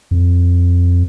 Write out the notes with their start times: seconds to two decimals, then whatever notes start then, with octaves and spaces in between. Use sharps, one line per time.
0.11 F2